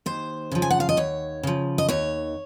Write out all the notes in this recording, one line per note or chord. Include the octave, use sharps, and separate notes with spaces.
D#2 C5
C#3 F3
G#5
F#5
F5
D#5
D#2 C#5
C#3 F3
D#5
D#2 C#5